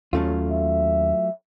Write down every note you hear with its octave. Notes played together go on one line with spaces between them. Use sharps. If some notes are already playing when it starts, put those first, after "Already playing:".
D#2 F#3 A3 C#4 F4
E5